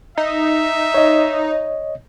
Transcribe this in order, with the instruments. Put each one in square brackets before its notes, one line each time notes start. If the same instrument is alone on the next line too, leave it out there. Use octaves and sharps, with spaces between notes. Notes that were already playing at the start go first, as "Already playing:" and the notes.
[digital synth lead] D#4 [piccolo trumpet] E5
[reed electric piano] C#5 D#5